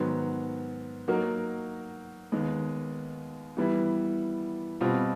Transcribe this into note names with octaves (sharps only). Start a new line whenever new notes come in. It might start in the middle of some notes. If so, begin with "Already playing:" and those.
Already playing: G#2 D#3 F#3 B3
F#3 A#3 D#4 F#4 A#4
D#2 D#3 G#3 B3
E3 G3 B3 E4
B2 G3 C4 F4